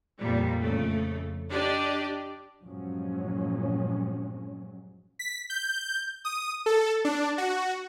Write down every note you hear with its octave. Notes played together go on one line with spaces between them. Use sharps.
F2 A#2 G3
F2 C#3 A3
D4 G4 D5 D#5
G2 A#2 F3 F#3 G#3 C#4
B6
G6
D#6
A4
D4
F#4